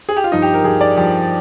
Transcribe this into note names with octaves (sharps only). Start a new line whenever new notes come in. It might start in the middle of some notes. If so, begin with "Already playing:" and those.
G#4
G4
F4
G2 F3 D#4
G4
A#4
G2 F3 G#4
D5
G2 F3 G4